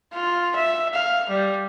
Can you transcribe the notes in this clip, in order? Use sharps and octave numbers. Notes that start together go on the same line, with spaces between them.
F4
E5
F5
G3